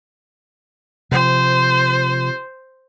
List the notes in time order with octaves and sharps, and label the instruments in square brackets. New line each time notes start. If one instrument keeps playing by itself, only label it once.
[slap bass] C3 F3 [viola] C5